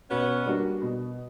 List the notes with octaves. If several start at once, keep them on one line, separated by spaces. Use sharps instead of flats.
B2 B3 C#4
G3 A#3 D4 F#4
B2